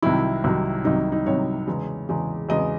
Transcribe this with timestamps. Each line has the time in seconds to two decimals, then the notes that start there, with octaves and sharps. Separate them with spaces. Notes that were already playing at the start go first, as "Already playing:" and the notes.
0.02 C2 C3 D#3 F#3 E4
0.44 C2 C3 D#3 F#3
0.85 C2 C3 D#3 F#3 D#4
1.12 D#4
1.26 C2 C3 D#3 F#3 C#5
1.67 E2 C#3 G#3
2.09 E2 C#3 G#3
2.49 E2 C#3 G#3 D#5